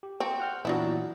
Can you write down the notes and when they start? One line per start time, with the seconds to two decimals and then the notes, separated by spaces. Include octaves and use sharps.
0.03 G4
0.20 C4 C#6
0.40 F#5 F6 G6
0.65 A#2 E3 F#3 B3 D4 E4